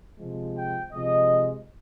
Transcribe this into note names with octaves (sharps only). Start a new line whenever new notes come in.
C3 F3 G#3
G5
C3 F3 G#3 D#5